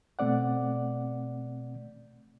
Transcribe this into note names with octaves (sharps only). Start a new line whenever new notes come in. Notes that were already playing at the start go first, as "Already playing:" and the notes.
B2 A3 C4 D5 F#5